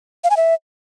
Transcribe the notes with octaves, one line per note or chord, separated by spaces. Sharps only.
F5
G#5
E5